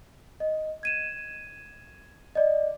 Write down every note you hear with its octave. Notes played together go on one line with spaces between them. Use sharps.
D#5
G#6 D#7 E7
D5 D#5